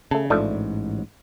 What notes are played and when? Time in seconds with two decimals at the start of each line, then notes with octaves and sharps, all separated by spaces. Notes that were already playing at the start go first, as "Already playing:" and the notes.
0.11 C#3 A3 A5
0.30 A1 G#2 F3 A3 D4